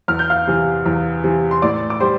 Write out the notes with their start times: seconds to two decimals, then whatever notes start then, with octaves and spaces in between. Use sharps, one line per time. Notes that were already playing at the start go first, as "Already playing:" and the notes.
0.08 E2 F6
0.19 G6
0.30 F5 F6
0.47 C3 E3
0.86 E2
1.24 C3 E3
1.51 C6
1.62 A2 D5 D6
1.90 D6
2.00 G3 C5 C6